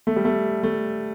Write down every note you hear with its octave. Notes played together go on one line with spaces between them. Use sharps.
A3
G3
A3
A3